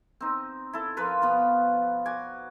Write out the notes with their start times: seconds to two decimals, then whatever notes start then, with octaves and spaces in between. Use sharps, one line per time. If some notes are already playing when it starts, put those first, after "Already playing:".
0.20 C4 D#4
0.73 E4 A4
0.97 F3 F4 A#4 B4
1.22 B2 F3 B3 B5
2.06 F#4 D5 G#5